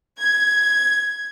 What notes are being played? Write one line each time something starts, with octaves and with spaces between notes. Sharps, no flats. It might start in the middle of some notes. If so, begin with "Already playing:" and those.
G#6